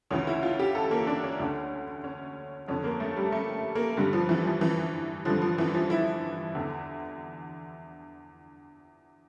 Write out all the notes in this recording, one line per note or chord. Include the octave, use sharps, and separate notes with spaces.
D2 C#3 E3 C#4
E4
F4
G4
A4
A#3
D4
C#4
D2 D3
C#4
F2 D3 C#4
A#3
A3
G3
A3
A#3
G2 D3 G3
F3
E3
F3
E3
G2 D3 F3
F3
E3
F3
E4
E2 D3